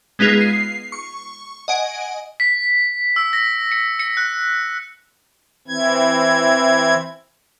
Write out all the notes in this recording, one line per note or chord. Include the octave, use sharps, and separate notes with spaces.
G#3 B3 D#4 F4 G#4
C7
C#6
D#5 F#5 G#5 D7
B6
E6
A#6
C#7
C#7
F#6
E3 C4 E4 G#6